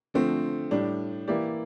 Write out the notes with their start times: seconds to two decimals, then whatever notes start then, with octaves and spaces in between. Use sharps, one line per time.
0.14 D3 F3 A3 C4
0.71 A2 G3 D4
1.28 E3 A#3 E4 G4 D5